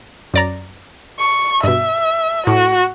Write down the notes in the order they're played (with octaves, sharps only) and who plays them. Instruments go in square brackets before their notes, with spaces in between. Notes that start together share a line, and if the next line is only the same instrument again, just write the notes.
[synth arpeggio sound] F#2 D5 A#5
[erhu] C#6
[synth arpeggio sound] G2 B2 [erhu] E5
[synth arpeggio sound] A2 [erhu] F#4